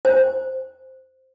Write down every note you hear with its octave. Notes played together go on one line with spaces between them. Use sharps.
C5